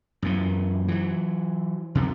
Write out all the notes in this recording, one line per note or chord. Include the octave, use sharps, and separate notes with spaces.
F#2 A#2 E3
E3 F#3
E2 C3 D#3 F#3